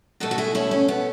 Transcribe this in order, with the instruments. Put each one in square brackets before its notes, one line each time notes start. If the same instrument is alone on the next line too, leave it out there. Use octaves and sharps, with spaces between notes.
[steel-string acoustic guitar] B2 A3 F#4 A4
F#4
E4 G#4
C#4 E4
C#4
B3